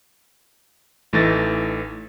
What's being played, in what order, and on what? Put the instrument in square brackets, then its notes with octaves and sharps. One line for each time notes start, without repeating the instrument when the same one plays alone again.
[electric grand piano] A1 E3 A3 D#4 A6 A#6